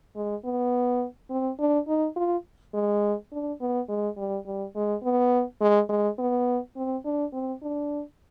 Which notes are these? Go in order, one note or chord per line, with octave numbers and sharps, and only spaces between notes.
G#3
B3
C4
D4
D#4
F4
G#3
D4
B3
G#3
G3
G3
G#3
B3
G#3
G#3
B3
C4
D4
C4
D4